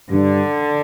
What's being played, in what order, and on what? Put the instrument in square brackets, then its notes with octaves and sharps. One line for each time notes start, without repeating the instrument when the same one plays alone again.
[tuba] G2 [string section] D3